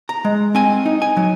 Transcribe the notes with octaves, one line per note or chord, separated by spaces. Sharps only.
A#5
G#3
C4 G#5
D#4
G#5
F#3